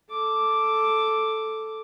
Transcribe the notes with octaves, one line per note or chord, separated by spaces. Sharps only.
A4 D6